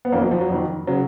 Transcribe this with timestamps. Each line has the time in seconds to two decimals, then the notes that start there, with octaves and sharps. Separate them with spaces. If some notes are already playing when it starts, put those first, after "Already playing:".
0.05 B3
0.12 F2 D#3 A#3 C#4
0.22 F#3
0.31 F3
0.41 F#3
0.50 F2 D#3
0.87 C#3 F#3